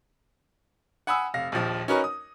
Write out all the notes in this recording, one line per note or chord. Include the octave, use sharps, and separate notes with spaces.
F#5 G#5 B5 D#6 E6
F1 F5 A#6
A#1 D#2 F3
C#4 D#4 F#4 A#4 B4 C#5
D#6